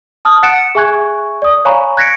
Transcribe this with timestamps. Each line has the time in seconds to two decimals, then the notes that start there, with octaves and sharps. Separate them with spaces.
0.25 A5 D#6 F6
0.43 F#5 F#6 A6 C#7 D7 E7
0.75 G#4 E5 G#5 C#6 F#6 G#6
1.42 D5 D#6
1.65 C#5 F5 G#5 A#5 B5 C#6
1.97 F#6 G#6 A#6 B6 C#7 D7